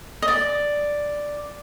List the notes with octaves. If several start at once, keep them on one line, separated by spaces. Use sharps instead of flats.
D#5
D5